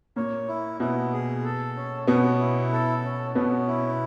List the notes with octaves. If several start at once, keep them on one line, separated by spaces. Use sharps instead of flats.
A#2 A#3 C#5
E4
B2 B3 E4
G#4
A4
C#4
B2 B3 C#4
E4
A4
C#4
B2 B3 C#4
E4